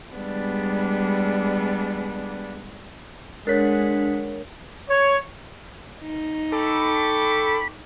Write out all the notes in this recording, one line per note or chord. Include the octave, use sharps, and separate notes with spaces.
G3 G#3 B3 D4
G#3 D4 A#4 C#5 F#5 B6
C#5
D#4
A4 G5 B5 C#6 D6